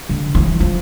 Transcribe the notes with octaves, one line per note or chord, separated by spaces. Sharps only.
D3
E3
F3